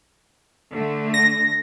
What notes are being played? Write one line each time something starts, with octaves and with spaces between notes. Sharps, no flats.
D3 A3
A#6